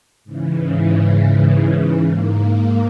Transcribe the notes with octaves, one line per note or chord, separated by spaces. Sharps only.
G#2 C#3 E3
G#2 A#3